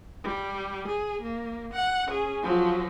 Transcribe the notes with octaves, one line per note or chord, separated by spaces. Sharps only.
G3
G#4
A#3
F#5
C#4 G#4
F3 F#3